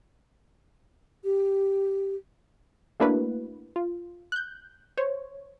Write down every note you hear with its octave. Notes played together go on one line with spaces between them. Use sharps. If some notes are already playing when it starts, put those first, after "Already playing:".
G4
A3 A#3 D4 E4 F#4 B4
F4
F#6 G6
C5 C#5